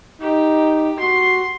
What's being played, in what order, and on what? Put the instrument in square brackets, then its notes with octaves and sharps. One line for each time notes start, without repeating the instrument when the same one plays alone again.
[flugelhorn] D#4 [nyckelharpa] G4
[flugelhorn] F#4 [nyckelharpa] C6